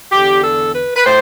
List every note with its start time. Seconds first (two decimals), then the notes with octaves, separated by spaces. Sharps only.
0.12 E2 D3 G4
0.43 A4
0.75 B4
0.96 B4
1.05 A2 C5